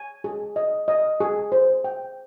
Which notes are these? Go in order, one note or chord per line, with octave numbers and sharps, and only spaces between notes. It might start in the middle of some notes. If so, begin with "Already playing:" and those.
Already playing: G#5
G#4
D#5
D#5
G#4
C5
G5